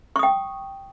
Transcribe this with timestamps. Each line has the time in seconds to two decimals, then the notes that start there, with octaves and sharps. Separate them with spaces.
0.16 C#6
0.19 D#6
0.23 G5